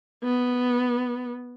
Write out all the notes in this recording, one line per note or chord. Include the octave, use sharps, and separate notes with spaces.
B3